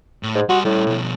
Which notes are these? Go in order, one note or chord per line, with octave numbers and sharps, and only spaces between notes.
A2
G#2
G3 F#4 C6
A2 G3 C#4
B2 F3